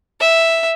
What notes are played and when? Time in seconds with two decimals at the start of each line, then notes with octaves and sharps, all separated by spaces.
0.20 E5